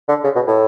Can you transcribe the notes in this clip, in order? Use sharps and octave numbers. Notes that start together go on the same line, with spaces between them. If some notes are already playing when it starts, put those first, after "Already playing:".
D3
C#3
B2
A2